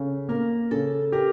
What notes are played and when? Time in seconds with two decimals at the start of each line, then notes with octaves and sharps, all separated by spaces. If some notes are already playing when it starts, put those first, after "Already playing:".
Already playing: C#3 A4
0.29 A#3 A#4
0.71 C#3 A4
1.12 G4 A#4